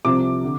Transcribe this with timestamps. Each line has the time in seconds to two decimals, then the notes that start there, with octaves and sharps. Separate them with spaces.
0.05 C2 C3 F3 D6
0.43 D3